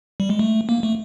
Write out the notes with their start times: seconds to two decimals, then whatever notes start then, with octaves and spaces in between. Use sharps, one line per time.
0.20 G3
0.30 G#3
0.39 A3
0.69 A#3
0.83 A3